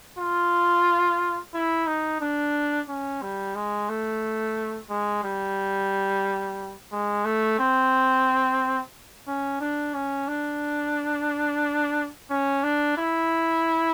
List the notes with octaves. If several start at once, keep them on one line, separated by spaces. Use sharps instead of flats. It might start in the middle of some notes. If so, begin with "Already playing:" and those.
F4
E4
D#4
D4
C#4
G3
G#3
A3
G#3
G3
G#3
A3
C4
C#4
D4
C#4
D4
C#4
D4
E4